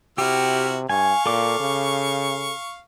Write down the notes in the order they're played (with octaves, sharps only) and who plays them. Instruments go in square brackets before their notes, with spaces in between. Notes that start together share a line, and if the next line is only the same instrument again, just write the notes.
[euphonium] C3 [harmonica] E4 F#4 F6 [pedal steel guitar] G4
[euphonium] G2 [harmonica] F5 C#6 [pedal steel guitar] G#5
[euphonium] A#2 [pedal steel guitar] A4 D6
[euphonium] C#3